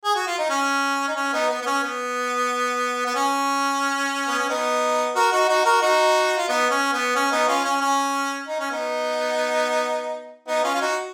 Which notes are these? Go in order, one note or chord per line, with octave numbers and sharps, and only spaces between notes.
G#4
F#4
F4
D#4
C#4
D#4
C#4
B3 D#4
B3
B3
C#4
B3
B3
C#4
B3
C#4
B3 D#4
F#4 A#4
D#4 F#4
D#4 F#4
F#4 A#4
D#4 F#4
F4
B3 D#4
C#4
B3
C#4
B3 D#4
C#4 F4
C#4
C#4
D#4
C#4
B3 D#4
B3 D#4
C#4 F4
F4
D#4 F#4